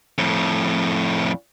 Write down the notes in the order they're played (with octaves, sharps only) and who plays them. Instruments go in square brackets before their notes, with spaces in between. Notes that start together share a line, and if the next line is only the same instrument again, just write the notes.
[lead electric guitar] F2 A2